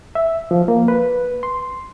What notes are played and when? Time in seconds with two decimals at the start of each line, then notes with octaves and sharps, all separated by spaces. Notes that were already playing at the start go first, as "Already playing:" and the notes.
0.15 E5
0.51 F3
0.68 A#3
0.88 B4
1.43 C6